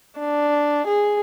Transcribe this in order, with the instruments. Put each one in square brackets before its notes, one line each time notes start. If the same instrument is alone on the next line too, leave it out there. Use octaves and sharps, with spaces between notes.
[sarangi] D4
G#4